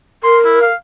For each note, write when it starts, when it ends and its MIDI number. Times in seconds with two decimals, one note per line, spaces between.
0.24 0.66 70
0.24 0.38 84
0.45 0.60 64
0.61 0.75 77